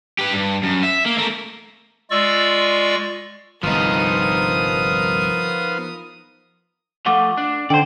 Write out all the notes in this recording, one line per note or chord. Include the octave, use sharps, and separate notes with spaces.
G4 B4
G2
F#2
E5
A#3
A3 A#4
G#3 F4 D5 C#6 E6
G1 C2 F3 B3 D#4 F4 A#4 D#6
F3 A3 F#5 D6
D4
D3 C5 D5 G5